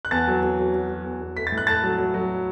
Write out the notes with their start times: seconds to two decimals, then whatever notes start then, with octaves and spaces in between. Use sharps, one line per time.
0.05 F#6
0.11 E2 A5 A6
0.27 F#3
0.43 F#3
0.59 F#3
0.74 F#3
0.89 F#3
1.05 E2
1.21 E2
1.36 A3 B6
1.47 A6
1.52 A2
1.58 F#6
1.67 A3 A5 A6
1.83 F#3
1.98 F#3
2.14 F#3